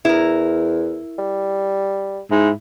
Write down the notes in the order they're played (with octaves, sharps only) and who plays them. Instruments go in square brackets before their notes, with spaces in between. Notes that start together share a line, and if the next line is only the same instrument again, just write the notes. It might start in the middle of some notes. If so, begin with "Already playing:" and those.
[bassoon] E2 [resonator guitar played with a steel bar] E4 A#4
[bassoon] G3
[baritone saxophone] G#2 [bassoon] E4